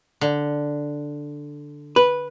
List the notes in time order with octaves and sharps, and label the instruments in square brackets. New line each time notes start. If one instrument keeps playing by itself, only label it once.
[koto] D3
[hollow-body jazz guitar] B4